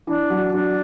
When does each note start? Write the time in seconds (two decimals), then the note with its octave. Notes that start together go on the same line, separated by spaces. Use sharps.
0.07 E3 D4
0.30 F#3
0.53 F#3 D4